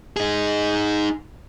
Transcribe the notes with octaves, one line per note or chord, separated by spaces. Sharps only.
D#4 G#4